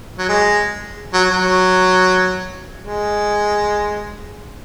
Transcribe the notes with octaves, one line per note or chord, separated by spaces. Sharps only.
F#3
G#3
F#3
F#3
G#3